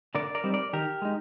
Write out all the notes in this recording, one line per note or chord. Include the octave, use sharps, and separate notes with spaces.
D3 A#4 D5
A#4 D5
G3 C4 D#4
A#4 D5
D#3 G4 A#4
G#3 D#4